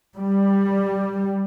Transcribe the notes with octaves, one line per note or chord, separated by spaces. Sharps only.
G3